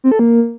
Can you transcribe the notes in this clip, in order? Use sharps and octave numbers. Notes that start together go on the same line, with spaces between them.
C4
A4
A#3